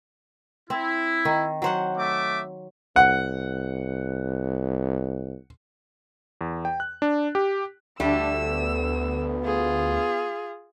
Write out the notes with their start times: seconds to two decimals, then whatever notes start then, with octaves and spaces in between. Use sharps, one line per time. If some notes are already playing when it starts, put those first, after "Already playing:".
0.70 C4 E4
1.25 D#3
1.62 F#3 C5 F#5
1.97 A3 E5 D6
2.96 C2 F#5
6.41 E2
6.65 G5
6.80 F#6
7.02 D4
7.35 G4
8.00 D2 D3 G3 A3 D4 E6
8.49 B3
9.44 F4 G#4